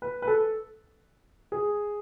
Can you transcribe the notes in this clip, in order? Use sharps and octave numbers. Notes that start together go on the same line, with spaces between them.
B4
B4
A4
G#4